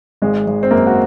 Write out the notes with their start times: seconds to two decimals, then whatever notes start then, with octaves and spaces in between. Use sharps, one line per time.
0.22 G#1 G#3
0.47 G#1
0.63 C4
0.71 F#2 A#3
0.87 F#4